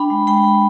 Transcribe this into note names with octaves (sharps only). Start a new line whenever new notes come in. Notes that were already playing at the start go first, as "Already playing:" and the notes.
Already playing: D4 G5 B5
G#3
G#3 G5 B5
G#3